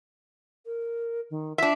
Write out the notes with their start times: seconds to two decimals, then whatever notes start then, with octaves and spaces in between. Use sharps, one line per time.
0.66 A#4
1.30 D#3
1.58 D4 F4 E5